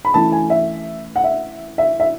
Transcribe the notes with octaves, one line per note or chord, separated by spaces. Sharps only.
B5
E3 A3 C#4 E4 A5
G#5
E5
F#5
E5
E5
E5